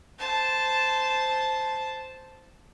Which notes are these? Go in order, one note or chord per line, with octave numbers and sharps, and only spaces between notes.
C5 A5